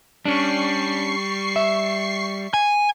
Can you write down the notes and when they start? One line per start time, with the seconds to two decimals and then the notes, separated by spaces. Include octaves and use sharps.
0.26 G3 C#4 D4 C#6 C7
1.56 E5
2.54 G#5